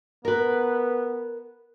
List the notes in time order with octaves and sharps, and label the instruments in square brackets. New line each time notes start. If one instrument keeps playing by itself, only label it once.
[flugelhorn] B3 [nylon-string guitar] A#4 B4